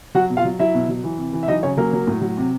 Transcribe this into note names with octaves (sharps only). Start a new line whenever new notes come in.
F#3 F#4 F#5
B2
F4 F5
F#3
F#3 E4 E5
B2
F#3
E3
C3
E3
E5
F#3 D#4 D#5
C#3 C#4 C#5
F#3 A#3 A#4
F#3
A2
F#3
C3